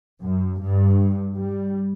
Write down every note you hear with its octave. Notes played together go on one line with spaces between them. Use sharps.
F#2
G2
G3